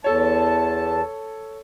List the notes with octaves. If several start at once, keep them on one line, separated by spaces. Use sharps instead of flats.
E2 A4 C#5 A5